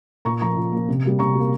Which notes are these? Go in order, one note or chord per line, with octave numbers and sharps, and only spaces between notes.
A#2 A#5 C#6
F3 A#3 A#5 C#6
A#2
F3 A#3
C3
G3 A#3
C3 A#5 C#6
G3 A#3